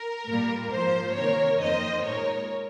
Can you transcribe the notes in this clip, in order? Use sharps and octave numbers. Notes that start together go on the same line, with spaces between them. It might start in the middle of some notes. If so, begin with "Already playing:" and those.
Already playing: A#4
A#2 G3 A#3
G#2 F3 A#3 C5
C3 D#3 A#3 A#4 C#5
F2 D#3 A#3 C5 D#5
A#2 G#3 A#4 C#5